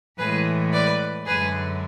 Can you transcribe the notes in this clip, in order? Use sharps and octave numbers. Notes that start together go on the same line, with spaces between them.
A2 E3 G#3 G#4 B4
B4 D5
F#2 D3 G#3 G#4 B4